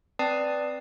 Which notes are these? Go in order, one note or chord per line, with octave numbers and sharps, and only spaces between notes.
C4 B4 D5 A5 D#6 C7